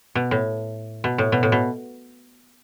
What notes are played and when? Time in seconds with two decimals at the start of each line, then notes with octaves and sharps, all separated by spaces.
0.15 B2
0.31 A2
1.04 B2
1.18 A2
1.32 B2
1.43 A2
1.52 B2